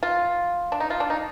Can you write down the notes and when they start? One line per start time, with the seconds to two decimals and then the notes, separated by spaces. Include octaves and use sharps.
0.03 F4
0.72 D4
0.80 D#4
0.90 F4
1.00 D4
1.10 D#4